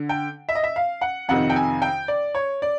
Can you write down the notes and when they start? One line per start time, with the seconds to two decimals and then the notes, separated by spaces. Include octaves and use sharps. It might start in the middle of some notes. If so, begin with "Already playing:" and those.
Already playing: D3
0.09 G5
0.49 E5
0.55 D#5
0.64 E5
0.76 F5
1.01 F#5
1.29 F2 C3 D#3 F#5
1.50 G5
1.56 G#5
1.82 G5
2.08 D5
2.35 C#5
2.62 D5